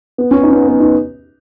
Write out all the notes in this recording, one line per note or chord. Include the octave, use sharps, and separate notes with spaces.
B3
C#4
D#4
C#4
B3
B3
D#4